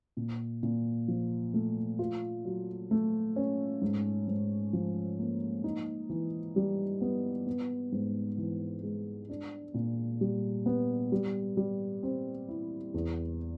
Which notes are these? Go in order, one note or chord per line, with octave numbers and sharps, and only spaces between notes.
A#2
A#2
F3
A3
F4
F#3
A3
C#4
G#2
G#2
F3
A#3
D#4
E3
G3
B3
B3
G#2
E3
G#3
D4
A#2
G3
B3
G3
G3
C4
E4
E2